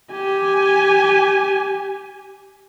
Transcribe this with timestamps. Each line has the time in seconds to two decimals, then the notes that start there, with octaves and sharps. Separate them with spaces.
0.12 G4 G#5